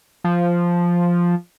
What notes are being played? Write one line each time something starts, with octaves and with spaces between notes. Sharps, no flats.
F3